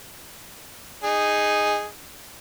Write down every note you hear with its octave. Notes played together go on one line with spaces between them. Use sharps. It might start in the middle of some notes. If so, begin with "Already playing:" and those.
D#4 G#4